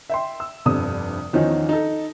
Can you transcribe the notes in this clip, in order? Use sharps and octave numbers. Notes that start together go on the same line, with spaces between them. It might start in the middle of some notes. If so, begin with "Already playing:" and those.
E5 G5 C6
E6
F1 G2 C3 D#6
E2 D#3 F3 C#4 D#4
D#4 A4